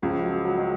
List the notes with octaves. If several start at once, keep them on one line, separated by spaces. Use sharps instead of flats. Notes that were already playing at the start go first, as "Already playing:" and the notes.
C#2 C#3 F3
F#3
F#3
G#3